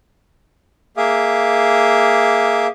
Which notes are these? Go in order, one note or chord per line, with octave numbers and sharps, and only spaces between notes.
A#3 G#4 E5 F5 D6 D#6